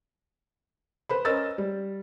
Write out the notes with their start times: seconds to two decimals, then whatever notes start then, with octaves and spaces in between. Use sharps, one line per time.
1.09 B4 C5 B5
1.25 C#4 A#4 C5 D#5 E6 A6
1.58 G3